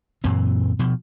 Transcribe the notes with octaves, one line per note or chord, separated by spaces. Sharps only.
F#2 A#2 E3 C4
B2 F3